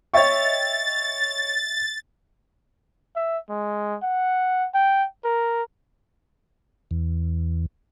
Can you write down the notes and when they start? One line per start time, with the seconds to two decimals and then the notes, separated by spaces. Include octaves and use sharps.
0.14 C#5 D#5 E5 G5 C#6 A6
3.16 E5
3.49 G#3
4.03 F#5
4.74 G5
5.25 A#4
6.91 E2